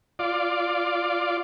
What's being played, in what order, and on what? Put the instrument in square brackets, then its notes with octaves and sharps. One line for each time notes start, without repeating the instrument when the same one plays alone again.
[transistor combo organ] F4 D5